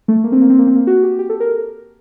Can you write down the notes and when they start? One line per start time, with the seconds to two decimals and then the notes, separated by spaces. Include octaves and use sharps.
0.08 A3
0.24 A#3
0.32 C4
0.42 A#3
0.50 C4
0.59 A#3
0.67 C4
0.76 A#3
0.87 F#4
1.03 G4
1.19 G4
1.29 A4
1.40 A#4